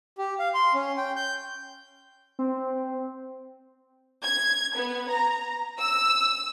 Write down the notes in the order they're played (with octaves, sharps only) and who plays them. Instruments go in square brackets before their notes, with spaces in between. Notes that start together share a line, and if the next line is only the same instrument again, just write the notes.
[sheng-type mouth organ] G4
F5
C6
C#4
G5
G6
[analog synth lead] C4
[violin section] G#6
B3
A#5
E6